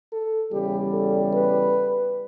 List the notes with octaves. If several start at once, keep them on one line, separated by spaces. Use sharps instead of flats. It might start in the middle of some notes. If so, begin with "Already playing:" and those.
A4
E2 C#3 G3 G4
A4
B4